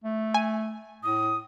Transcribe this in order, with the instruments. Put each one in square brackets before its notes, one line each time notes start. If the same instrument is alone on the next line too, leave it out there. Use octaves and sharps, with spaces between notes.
[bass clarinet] A3
[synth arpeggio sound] G#5
[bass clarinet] A2 [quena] D#6